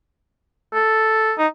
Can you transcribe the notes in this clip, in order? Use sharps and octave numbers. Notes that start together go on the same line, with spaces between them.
A4
D#4